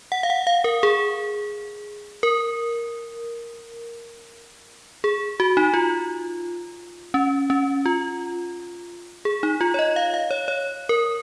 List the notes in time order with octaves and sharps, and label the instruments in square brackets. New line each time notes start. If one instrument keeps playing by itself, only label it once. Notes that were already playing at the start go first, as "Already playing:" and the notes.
[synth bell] F#5
F5
F#5
F5
A#4
G#4
A#4
G#4
F#4
D#4
F4
C#4
C#4
F4
G#4
D#4
F4
C#5
D#5
F5
F5
C#5
C#5
A#4